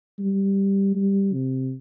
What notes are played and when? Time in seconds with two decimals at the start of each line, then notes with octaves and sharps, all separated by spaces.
0.19 G3
0.95 G3
1.34 C3